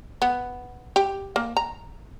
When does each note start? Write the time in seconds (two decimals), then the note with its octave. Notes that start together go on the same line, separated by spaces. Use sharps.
0.22 B3
0.96 G4
1.36 A#3
1.57 A#5